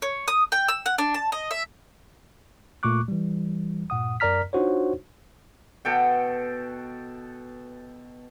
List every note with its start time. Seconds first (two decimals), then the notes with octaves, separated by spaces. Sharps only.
0.02 C#5
0.28 D#6
0.52 G5
0.68 E6
0.86 F#5
0.98 D4
1.14 A5
1.32 D#5
1.51 E5
2.83 A#2 A3 C#6 D6 F#6
3.08 E3 G3
3.90 G2 A#2 F#5 D#6
4.20 F#2 A#4 D5 A#5 F6 B6
4.53 D4 D#4 F4 F#4 C5 C#5
5.85 B2 A4 G5